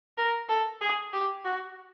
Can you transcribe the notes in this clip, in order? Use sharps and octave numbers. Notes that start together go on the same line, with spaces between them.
A#4
A4
G#4
G4
F#4